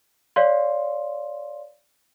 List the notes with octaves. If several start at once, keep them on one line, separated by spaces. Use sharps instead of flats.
C#5 D5 F5 C6